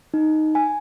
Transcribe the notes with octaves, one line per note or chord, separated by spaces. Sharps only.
D#4
G#5